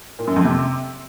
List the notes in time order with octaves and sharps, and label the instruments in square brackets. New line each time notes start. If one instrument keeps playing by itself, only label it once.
[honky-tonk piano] A#2
F#2
F2
C3